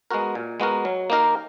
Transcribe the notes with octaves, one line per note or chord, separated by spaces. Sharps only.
G#3 B3 F#4 A#4
A#2
G#3 B3 F#4 A#4
F#3
A#3 D#4 A#4